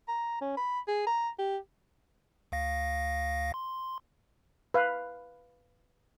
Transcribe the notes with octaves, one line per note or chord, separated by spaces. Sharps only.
A#5
C#4
B5
G#4
A#5
G4
D2 F5 A#6
C6
B4 F5